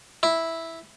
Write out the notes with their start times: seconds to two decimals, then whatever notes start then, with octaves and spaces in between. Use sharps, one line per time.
0.23 E4